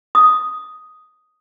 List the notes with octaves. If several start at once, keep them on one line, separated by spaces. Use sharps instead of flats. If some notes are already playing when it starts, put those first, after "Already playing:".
D#6